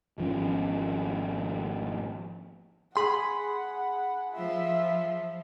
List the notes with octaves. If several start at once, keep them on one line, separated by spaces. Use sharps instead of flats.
G#1 F3 C#4
G#4 F#5 B5 C6
F3 F4 E5